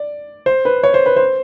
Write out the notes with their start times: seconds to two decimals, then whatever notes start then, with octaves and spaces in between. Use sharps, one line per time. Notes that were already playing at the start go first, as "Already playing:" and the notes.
Already playing: D5
0.46 C5
0.65 B4
0.83 C#5
0.94 C5
1.06 B4
1.16 C5